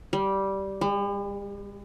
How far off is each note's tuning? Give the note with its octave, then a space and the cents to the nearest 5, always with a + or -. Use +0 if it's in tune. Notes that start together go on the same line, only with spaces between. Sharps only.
G3 -10
G3 +45